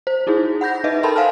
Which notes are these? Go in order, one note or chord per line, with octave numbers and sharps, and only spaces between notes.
C5
D#4 E4 F#4 G#4
F#5 B5 G6 A#6
D#4 B4 D#5 E5
A4 A#4 G5 A5 B5 C6
C5 F5 F#5 G#5 A5 F6